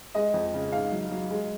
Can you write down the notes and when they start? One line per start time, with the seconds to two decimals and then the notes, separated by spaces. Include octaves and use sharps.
0.15 G#3 D#5
0.34 F2
0.54 C#3
0.72 G#2 F5
0.92 F#3
1.11 F#3
1.30 G#3